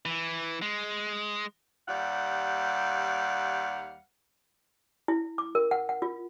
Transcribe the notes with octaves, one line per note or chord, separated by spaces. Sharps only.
E3
G#3
D#2 G3 F5 F#5
E4
D6
A#4
F#5
F#5
F4